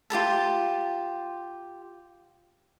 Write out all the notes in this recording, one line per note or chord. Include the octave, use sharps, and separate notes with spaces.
F4 G4 A4 A5